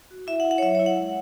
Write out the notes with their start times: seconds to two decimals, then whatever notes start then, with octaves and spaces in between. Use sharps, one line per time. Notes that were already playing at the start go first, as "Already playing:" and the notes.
0.11 F#4
0.27 E4 E5
0.40 F#5
0.45 E4
0.51 F#5
0.58 C#5
0.62 F#3 E5
0.75 E4 C#5
0.86 F#5
0.97 G#3